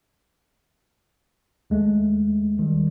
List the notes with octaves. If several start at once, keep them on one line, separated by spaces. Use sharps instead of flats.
D#2 G#3 A3
D#3 G3